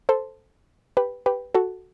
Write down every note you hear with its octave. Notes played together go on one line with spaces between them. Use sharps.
A4 C5
G4 B4
G4 B4
F#4 A4